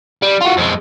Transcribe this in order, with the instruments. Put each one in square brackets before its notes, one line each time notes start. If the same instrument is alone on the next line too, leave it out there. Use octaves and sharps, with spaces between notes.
[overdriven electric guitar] G3
F4 F#4
F2 G#3